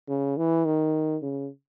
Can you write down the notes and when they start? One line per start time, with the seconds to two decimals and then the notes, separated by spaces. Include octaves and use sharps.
0.09 C#3
0.37 E3
0.65 D#3
1.22 C#3